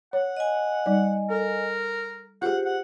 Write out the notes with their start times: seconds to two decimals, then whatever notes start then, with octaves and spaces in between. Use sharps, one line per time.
0.13 C#5 F#5
0.37 D#5 G#5
0.86 G3 D#4 D5
1.30 A4 A#4
2.42 F4 G4 G#4 C5 F#5
2.65 F#5